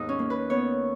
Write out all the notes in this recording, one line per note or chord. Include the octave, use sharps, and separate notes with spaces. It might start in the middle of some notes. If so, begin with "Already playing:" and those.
Already playing: D#2 G#2 B3 D#4
C#4
A#3
B4
B3 C#5